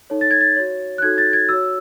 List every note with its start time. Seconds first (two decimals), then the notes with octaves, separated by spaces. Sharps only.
0.10 D#4 A4 C#5
0.21 A6
0.31 G#6
0.41 A6
0.56 F#4 C#5
0.98 F#6
1.02 D#4 F#4 A4 C#5 G#6
1.18 A6
1.33 G#6
1.49 F#4 C#5 E6